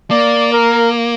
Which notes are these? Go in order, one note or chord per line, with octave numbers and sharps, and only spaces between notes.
A#3 D5
A#4